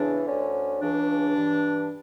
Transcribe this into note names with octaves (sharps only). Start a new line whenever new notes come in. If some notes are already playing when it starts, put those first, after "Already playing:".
Already playing: E2 C#3 E3 D4
D2 D3 C#4
C#2 C#3 E3 D4
G2 E3